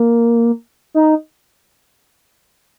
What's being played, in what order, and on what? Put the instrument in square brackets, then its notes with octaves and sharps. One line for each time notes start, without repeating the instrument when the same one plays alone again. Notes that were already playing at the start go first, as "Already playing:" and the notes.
Already playing: [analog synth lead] A#3
D#4